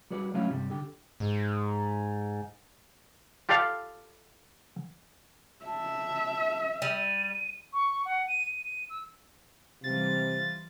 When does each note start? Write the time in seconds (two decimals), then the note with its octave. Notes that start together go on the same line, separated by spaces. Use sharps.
0.11 G3 F#4 B4 D5
0.34 F#3 A3 C#4 E4 F4 F5
0.51 G2 C3 G3
0.70 D3 G4
1.20 G#2
3.49 F4 G4 A4 D5 F5 G5
5.65 E5 A5
6.82 G3 D#7
7.73 C#6
8.05 F#5
8.28 D#7
8.46 D#7
8.64 D#7
8.90 E6
9.84 C3 E3 G3 F4 A6